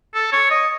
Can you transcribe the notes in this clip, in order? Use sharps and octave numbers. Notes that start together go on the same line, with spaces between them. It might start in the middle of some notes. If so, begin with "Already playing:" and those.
A4
C#5
D#5